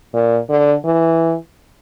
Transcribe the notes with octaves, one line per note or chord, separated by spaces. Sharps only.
A#2
D3
E3